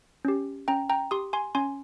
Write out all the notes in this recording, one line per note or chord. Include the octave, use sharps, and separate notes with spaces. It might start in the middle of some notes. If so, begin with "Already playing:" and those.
C#4 G4
C#4 G5 A#5
G5 A#5
G4 C6 D#6
G#5 C6
C#4 G#5 C6